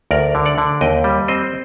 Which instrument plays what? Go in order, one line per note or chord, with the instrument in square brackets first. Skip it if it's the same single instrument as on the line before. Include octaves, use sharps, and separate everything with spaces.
[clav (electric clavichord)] D2 A#4 D5
D3
D5 F#5
D3
D#2 D#5 G5
G3
C4 C5 D#5